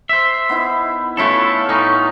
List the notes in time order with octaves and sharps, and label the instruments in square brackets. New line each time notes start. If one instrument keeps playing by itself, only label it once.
[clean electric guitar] C5 E5
[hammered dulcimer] B3 D#4 E4
[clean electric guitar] A3 E4 A4 [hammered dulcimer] C#4 F4 B4
[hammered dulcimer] A2 [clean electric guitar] C#4 D#4